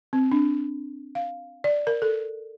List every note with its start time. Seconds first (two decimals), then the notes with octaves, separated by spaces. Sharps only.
0.13 C4
0.32 D4
1.15 F5
1.64 D5
1.87 A#4
2.02 A4